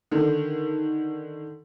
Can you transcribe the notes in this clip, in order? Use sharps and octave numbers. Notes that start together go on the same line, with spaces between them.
D3 D#3